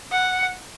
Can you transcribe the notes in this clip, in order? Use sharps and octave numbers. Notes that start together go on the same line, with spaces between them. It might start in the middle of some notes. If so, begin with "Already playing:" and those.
F#5